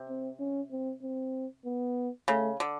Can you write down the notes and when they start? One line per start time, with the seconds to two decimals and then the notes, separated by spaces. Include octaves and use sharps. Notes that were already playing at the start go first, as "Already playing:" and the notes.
Already playing: C3
0.09 C4
0.39 C#4
0.71 C4
1.03 C4
1.65 B3
2.28 C#3 A3
2.60 D3